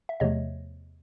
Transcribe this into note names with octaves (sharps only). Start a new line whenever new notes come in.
E5
E2 C3 F3 A3 C#5 D#5